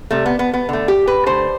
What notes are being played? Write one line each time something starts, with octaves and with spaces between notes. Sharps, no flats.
C3 G3 A3
B3
B3
B3
D3 A3
G4
B4
D3 A3 C5